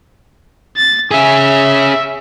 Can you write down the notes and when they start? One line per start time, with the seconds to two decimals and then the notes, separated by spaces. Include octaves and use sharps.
0.77 A6
1.11 C#4 G#4 E5